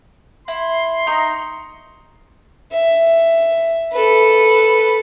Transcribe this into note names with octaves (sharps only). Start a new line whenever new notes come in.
E4 C6
D#4 A#5 C#6
E5
A4 B4